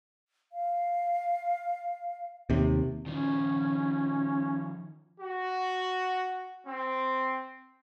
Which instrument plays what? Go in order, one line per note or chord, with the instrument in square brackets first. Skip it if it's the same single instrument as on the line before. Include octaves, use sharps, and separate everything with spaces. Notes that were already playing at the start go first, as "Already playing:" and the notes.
[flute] F5
[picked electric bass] D#2 C3
[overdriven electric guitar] D#3 F3 [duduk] C#4
[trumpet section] F#4
C4